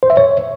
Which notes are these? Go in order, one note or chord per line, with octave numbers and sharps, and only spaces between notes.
C5
E5
C#5